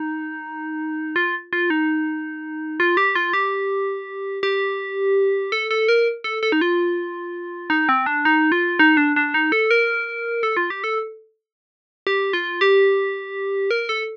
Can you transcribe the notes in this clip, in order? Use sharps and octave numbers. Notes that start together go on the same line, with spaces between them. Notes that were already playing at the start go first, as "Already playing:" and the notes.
Already playing: D#4
F4
F4
D#4
F4
G4
F4
G4
G4
A4
A4
A#4
A4
A4
D#4
F4
D#4
C4
D4
D#4
F4
D#4
D4
D4
D#4
A4
A#4
A4
F4
G4
A4
G4
F4
G4
A#4
A4